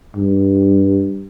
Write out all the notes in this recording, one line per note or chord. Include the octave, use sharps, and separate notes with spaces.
G2